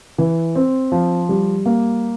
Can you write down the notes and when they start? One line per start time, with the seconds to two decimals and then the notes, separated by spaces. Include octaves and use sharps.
0.18 E3
0.56 C4
0.92 F3
1.29 G3
1.66 A#3